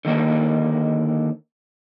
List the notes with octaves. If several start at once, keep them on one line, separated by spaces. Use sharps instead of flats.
D3 D#3 A#3 D4